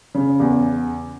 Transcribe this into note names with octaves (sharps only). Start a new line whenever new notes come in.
C#3
E2